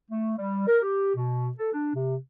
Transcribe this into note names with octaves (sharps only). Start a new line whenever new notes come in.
A3
G3
A#4
G4
B2
A4
D4
C3